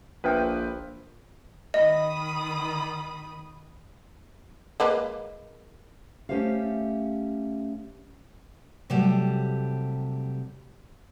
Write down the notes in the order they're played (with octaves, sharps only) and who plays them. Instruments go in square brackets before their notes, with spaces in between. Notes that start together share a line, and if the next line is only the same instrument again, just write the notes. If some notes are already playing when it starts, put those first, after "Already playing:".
[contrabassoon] A#1 [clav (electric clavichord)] F3 [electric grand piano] B4 E5 G5
[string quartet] D#3 B5 D#6 [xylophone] D#5
[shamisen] G#3 A#3 B4
[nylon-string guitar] A3 C#4 G4 C5 E5 F5
[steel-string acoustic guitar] C3 F#3 G3 A3